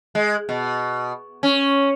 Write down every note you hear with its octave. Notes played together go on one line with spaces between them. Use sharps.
G#3
B2
C#4